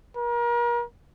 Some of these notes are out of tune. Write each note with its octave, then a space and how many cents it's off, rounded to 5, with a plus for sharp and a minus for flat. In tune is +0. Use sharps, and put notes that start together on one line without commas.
A#4 +35